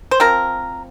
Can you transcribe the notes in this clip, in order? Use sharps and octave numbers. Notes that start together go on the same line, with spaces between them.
C5
F3 C4 A#4